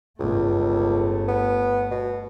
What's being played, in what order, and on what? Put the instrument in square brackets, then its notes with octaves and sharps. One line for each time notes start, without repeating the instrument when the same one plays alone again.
[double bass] G1 A3 [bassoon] C#2
[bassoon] B3
B2